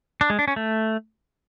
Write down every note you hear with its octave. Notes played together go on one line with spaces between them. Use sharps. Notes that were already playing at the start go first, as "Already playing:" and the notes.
D4
G#3
D4
C#4
A3